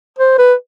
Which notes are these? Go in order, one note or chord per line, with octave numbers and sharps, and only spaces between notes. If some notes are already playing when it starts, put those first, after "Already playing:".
C5
B4